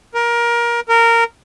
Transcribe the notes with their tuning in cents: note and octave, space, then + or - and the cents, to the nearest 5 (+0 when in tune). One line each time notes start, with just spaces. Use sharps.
A#4 +20
A#4 -15